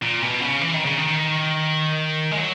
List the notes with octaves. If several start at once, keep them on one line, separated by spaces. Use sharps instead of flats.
A#2
B2
C#3
E3
D#3
C#3
D#3
G#3
F#3